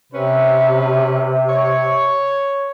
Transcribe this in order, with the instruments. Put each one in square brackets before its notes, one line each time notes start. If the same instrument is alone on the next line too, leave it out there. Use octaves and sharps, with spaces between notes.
[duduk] C3 [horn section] C4 C#4 B4
[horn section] C#5